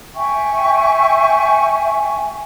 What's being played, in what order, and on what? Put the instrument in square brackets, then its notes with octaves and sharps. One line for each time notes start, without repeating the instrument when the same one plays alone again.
[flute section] E5 G5 G#5 C#6